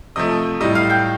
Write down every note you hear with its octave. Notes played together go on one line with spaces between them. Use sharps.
C3 F3 A3 D#5 D#6
A2 G3 D#5 D#6
F5 F6
G5 G6